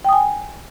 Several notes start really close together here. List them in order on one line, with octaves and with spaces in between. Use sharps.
G5 D#6 G#5